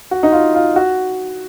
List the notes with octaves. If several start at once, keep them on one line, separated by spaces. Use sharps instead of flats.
F#4
D#4
F4
F4
F#4